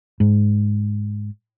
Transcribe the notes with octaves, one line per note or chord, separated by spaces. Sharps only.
G#2